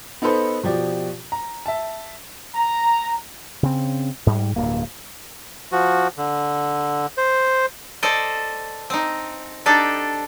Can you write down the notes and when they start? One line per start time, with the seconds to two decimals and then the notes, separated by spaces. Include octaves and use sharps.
0.22 B3 D#4 A4 B4 C5
0.63 B2 F3 G4 D5
1.32 A#5
1.66 E5 A5
2.55 A#5
3.63 C#3 C4
4.26 G#2 G3
4.56 D1 G2 A#3
5.72 F3 F#4
6.17 D3
7.18 C5
8.03 A4 C5 D5 D#5
8.90 C4 D#4
9.66 D4 D#4 G4 A4